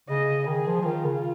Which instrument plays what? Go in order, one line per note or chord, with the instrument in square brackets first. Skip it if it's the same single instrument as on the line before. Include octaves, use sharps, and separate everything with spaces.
[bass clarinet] C#3 [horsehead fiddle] D#5
[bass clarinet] D#3 [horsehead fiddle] G#4
[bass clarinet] F3
F3
[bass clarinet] D#3 [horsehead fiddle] F4
[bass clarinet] C#3